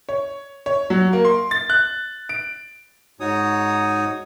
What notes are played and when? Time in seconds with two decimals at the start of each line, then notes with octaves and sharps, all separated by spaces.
0.09 C#5
0.66 C#5
0.90 F#3
1.13 A#3
1.25 C6
1.51 A6
1.70 F#6
2.29 D7
3.20 G#2 D#4 F#4 C#5 D#6